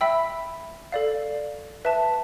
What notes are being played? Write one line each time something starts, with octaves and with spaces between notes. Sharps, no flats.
E5 G5 B5 E6
A4 D5 F5
B4 E5 A5